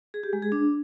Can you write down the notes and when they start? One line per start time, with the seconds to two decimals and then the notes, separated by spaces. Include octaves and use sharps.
0.14 G#4
0.23 G4
0.33 G#3
0.42 G#4
0.52 D4